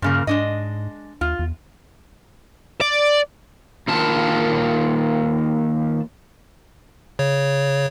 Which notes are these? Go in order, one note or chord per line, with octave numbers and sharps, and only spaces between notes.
G2 A#2 C#3 A#3
G#2 G#3 D4 D#5
D#2 F4
E2
D5
D#3 A#3 F4 A5
C#3 C#5